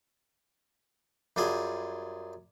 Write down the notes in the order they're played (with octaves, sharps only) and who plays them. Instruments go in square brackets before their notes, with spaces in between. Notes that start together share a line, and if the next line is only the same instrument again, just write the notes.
[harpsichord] F#2 G3 F4 G#4